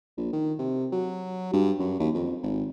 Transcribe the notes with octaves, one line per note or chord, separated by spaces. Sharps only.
A#1
D#3
C3
F#3
G2
F#2
D#2
F2
G#1